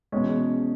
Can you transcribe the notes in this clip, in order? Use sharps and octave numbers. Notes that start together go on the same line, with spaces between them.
E2 B2 G#3 C#4